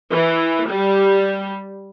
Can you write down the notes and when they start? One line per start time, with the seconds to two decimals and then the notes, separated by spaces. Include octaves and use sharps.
0.11 E3
0.69 G3